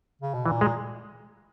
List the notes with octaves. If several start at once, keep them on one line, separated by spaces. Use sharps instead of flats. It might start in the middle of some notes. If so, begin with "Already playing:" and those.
C#3
B2
A#2 E3
G#3